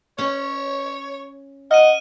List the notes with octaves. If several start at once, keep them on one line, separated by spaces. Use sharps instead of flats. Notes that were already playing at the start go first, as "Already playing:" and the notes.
C#4 C#5
D#5 F#5 F6 D#7